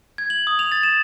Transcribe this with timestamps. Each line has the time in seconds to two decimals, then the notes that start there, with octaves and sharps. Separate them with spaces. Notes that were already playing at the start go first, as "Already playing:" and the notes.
0.18 G#6
0.30 F#7
0.47 D#6
0.59 F7
0.72 A6
0.83 E7